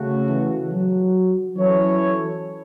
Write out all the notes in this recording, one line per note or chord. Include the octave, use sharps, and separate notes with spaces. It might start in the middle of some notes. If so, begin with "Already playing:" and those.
Already playing: C#3 A3 F#4
E3
F#3
E3 F#3 C#4 E4 A4 C#5